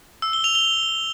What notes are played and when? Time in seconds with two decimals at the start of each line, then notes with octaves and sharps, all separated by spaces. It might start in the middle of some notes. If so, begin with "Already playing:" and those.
0.22 E6
0.33 G7
0.44 F7
0.55 G7